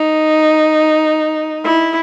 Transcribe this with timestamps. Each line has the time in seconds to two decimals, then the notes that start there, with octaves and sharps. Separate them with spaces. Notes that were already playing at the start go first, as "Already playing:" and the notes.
Already playing: D#4
1.65 E4